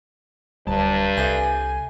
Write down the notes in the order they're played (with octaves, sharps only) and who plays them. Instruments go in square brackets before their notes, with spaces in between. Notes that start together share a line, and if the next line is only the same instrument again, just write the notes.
[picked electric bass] D1 [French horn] G2 [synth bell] G3 [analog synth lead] A5
[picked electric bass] C2 [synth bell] A4 E5 G6 [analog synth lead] G#5